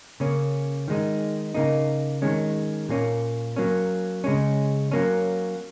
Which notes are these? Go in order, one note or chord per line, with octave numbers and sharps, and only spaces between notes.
C#3 A#3 C#4
D#3 G#3 D#4
C#3 A#3 D#4
D#3 G#3 C#4
A#2 A#3 C#4
F#3 A#3 C#4
C#3 G#3 C#4
F#3 A#3 C#4